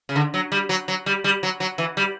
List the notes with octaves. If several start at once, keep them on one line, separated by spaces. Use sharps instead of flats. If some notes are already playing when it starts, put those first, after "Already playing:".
C#3
D3
F#3
G3
F#3
F#3
G3
G3
F#3
F#3
E3
G3